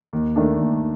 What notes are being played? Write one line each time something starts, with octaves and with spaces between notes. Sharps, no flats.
D#2
D#3 A3 D4
D#2